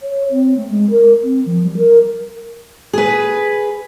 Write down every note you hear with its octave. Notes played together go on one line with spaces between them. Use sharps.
C#5
C4
A3
G#3
A#4
C4
F3
G3
A#4
G#4 B4